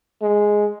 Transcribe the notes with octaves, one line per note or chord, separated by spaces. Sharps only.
G#3